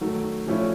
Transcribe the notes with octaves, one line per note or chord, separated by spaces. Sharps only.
D#3 F#3 A3
A#2 F3 A3 C#4 E4